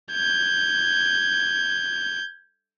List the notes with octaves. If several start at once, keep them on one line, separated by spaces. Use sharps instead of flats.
G6 G#6